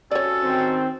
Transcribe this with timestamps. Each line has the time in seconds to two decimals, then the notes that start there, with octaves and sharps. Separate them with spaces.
0.11 C3 C#4 F#4 A4 C#5 D5
0.43 D#3 C4